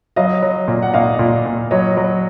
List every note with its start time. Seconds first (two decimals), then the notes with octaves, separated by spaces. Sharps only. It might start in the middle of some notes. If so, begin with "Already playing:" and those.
0.16 F#3 D#5 F5
0.42 F#3
0.68 A#2
0.82 F#5
0.93 A#2 D#5 F5
1.19 A#2
1.46 A#2
1.71 F#3 C#5 D#5
1.97 F#3